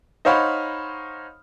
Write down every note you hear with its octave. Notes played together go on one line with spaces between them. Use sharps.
D#4 C5 C#5 F5 F#5 B5